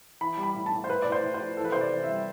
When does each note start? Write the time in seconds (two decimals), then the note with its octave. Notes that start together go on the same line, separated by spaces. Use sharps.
0.21 E3 B5
0.37 G3
0.43 B5
0.54 A2
0.66 A5
0.72 A2
0.84 C5
0.89 A2 B4
1.02 A2 D5
1.12 C5
1.24 A2
1.34 C5
1.40 F3
1.57 E3 A4
1.65 B4
1.72 C3 C5
1.81 D5
1.92 E3
2.04 E5
2.09 G3